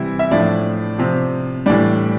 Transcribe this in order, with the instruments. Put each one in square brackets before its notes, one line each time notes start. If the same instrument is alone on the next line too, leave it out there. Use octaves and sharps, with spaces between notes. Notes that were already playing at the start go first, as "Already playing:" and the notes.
Already playing: [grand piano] C3 E3 G3 E4
E5
A2 F3 D4 D5
C3 F3
A2 E3 G3 D4 D5